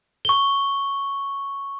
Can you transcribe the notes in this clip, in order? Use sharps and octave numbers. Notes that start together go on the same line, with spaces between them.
C#6 G7